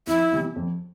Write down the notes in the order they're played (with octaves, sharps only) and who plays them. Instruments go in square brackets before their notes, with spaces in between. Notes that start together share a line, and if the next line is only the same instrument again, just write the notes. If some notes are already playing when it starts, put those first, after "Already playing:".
[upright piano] F2 [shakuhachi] E4
[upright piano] C3 E3 G3 B3
F2